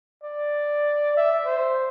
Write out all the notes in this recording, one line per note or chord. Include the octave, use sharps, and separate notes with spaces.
D5
E5
C5